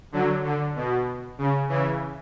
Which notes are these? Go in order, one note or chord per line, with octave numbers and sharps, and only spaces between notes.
D3 F#3
D3
B2
C#3
C#3 E3